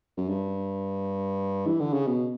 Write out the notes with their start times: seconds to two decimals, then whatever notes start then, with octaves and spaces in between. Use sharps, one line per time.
0.17 F#2
0.29 G2
1.66 E3
1.80 D3
1.93 C#3
2.07 B2